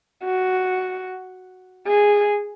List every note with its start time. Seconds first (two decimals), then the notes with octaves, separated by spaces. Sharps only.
0.24 F#4
1.87 G#4